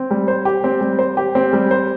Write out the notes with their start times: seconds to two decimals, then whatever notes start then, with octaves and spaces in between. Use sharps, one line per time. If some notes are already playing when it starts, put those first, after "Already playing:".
Already playing: C4
0.11 G3
0.28 C5
0.45 G4
0.64 C4
0.81 G3
0.99 C5
1.17 G4
1.35 C4
1.53 G3
1.71 C5